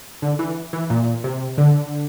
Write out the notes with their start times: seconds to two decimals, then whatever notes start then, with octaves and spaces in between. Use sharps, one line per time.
0.22 D3
0.39 E3
0.73 E3
0.90 A#2
1.24 C3
1.58 D3